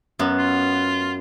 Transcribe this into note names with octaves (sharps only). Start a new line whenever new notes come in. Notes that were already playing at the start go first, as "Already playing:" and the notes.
F#2 B3
F4